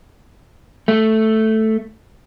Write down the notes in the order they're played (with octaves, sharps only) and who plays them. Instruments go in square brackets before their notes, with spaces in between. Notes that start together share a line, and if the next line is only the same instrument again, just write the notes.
[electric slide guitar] A3